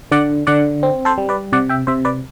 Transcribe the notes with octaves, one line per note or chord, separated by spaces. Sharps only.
D3 D5 F#5
D3 D5 F#5
C4
A4 C5
G3
B4 D5
C3 D5 F#5
E5 G5
C3 C5 E5
B4 D5